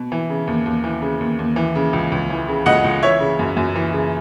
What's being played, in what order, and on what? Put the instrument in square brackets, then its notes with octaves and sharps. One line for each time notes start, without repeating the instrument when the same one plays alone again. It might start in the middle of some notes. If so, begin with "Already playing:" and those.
Already playing: [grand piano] B2
E3
C#3
D#2
D#2
E3
C#3
D#2
D#2
E3
C#3
C#2
C#2
E3
C#3
C#2 D#5 F#5
C#2
E3 C#5 E5
C#3
F#2
F#2
E3
C#3